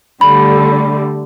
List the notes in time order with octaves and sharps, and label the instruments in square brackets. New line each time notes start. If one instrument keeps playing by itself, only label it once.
[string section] D3 G3 A3 [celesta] B5